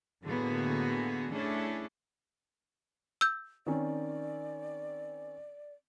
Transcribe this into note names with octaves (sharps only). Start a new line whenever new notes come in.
A2 D3 A#3 B3 F#4 G#4
A3 C#4 D4 E4 G#4
E6 G6
D#3 C4 C#4 D5